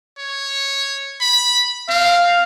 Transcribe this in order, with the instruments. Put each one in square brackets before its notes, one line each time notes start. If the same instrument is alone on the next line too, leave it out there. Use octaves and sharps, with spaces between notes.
[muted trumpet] C#5
B5
[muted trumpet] C4 [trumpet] F5